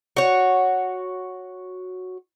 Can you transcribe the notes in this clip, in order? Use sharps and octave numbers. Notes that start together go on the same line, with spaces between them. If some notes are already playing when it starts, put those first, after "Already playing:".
F#4 C#5